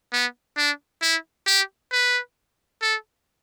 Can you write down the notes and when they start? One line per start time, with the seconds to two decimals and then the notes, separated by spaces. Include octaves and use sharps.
0.12 B3
0.57 D4
1.02 E4
1.47 G4
1.92 B4
2.82 A4